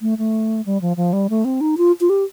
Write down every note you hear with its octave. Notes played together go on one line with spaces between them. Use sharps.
A3
A3
G3
F3
F3
G3
A3
C4
D#4
F4
F4
G4